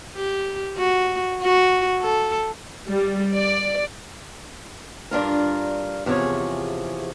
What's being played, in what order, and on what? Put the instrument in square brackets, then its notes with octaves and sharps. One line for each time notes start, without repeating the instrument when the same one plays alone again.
[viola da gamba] G4
F#4
F#4
A4
[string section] G3
D5
[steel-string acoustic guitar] G2 D4 F4 A#4
E2 C3 F3 G#4 C#5